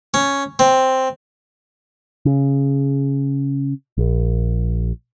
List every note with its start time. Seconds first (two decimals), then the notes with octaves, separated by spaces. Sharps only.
0.14 C#4
0.59 C4
2.25 C#3
3.98 A#1